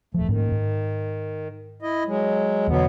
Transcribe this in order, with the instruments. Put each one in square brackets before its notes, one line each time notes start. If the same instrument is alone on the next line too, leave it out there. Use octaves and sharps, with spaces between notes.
[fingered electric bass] D#1 F3 [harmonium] A3
[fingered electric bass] G#2 A#3 C#4 [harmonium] D#3
[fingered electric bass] G#2
[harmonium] E4 D#5
F#3 G#3
[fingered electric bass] E2 D3 [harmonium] B2 F#3 B3